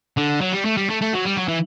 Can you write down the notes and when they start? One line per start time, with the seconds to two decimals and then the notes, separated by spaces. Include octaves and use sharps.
0.17 D3
0.41 F#3
0.53 G3
0.65 A3
0.77 G3
0.89 A3
1.01 A3
1.13 F#3
1.25 G3
1.37 F#3
1.48 E3